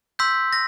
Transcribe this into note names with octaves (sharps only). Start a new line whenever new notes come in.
C6 E6 G6 B6
A#6